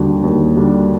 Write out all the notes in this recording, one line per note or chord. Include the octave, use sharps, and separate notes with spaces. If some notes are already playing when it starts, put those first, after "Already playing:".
Already playing: D#2 D3 G3 D4 F#4
D#2
D3 G3 D4 F#4